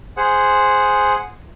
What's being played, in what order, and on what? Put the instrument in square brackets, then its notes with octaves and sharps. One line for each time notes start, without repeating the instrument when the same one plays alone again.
[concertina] G#4 C5 F#5